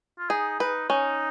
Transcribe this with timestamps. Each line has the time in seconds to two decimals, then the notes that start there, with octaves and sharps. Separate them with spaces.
0.19 F4
0.30 D#4 G#4
0.60 D#4 B4
0.90 C#4 D#4